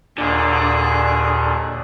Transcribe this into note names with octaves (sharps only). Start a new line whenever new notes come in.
D#2 A#2 D3 G#4